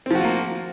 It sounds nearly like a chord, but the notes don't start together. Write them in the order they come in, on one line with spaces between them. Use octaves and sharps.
C4 F3 F#4 F4 A#3